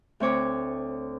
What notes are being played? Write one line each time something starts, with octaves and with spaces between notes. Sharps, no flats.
D2 C4 C#5 D6